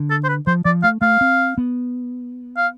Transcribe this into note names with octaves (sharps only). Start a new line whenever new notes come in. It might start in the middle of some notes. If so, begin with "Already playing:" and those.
Already playing: D3
A4
C5
B4
F3 C5
F3 D5
A3 F5
A3 F5
C4
B3
F5